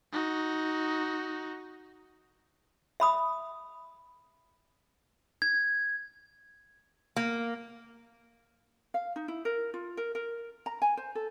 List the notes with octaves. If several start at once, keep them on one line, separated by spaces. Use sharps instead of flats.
D#4 F#4
E5 B5 D#6
G#6
A#3
F5
D#4
E4
A#4
F4
A#4
A#4
A#5
G#5
C5
A4